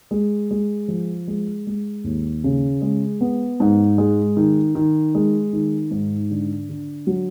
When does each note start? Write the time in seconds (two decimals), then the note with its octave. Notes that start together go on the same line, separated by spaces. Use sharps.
0.11 G#3
0.51 G#3
0.88 F3
1.28 G#3
1.67 G#3
2.04 D#2
2.44 C#3
2.82 G#3
3.21 B3
3.60 G#2
3.98 G#3
4.37 D#3
4.75 D#3
5.15 G#3
5.53 D#3
5.91 G#2
6.30 D3
6.69 D3
7.07 F#3